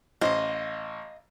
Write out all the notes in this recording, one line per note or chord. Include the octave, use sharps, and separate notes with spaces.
A1 C5 D#5 F5